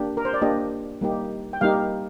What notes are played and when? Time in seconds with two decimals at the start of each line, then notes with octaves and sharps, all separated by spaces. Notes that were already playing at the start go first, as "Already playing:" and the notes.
Already playing: A#3 D4 G4
0.17 A#4
0.25 C5
0.34 D5
0.41 A#3 D4 G4 D#5
1.01 G3 A#3 D#4 G4
1.53 G5
1.61 G3 A#3 D#4 G4 F5